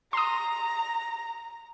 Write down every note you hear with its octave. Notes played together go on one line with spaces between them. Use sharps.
A#5 C6 D#6